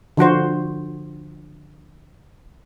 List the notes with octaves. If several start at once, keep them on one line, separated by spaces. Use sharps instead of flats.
D3 F3 F#4 C5